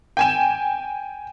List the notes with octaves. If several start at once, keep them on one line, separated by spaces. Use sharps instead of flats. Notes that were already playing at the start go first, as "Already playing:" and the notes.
G5 G#5 E7